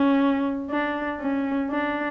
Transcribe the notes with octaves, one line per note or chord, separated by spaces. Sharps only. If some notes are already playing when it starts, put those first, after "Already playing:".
Already playing: C#4
D4
C#4
D4